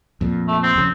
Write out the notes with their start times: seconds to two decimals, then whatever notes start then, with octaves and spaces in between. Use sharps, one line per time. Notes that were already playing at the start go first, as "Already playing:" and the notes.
0.21 F2 A#2
0.48 A3
0.63 C4
0.76 F2 C#3